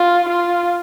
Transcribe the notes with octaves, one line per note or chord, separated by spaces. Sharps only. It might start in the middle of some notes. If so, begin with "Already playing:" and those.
Already playing: F4
F4